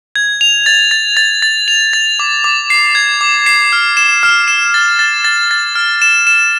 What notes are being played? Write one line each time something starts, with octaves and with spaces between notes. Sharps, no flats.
G#6
F7
A6
A6
A6
A6
F7
A6
D6
D6
C7
G#6
D6
C7
F6
E7
F6
E7
A6
A6
A6
A6
F6
E7
E7